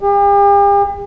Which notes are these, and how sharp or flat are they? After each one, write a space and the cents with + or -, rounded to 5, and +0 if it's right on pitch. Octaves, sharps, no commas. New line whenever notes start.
G4 +45